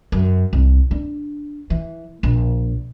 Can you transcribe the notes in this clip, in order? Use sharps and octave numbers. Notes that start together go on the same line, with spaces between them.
F#2
C2
D4
E3
A#1